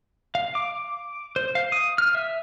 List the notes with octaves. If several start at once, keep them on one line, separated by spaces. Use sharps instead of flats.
F5
D6
C5
F5
D#6
F6
E5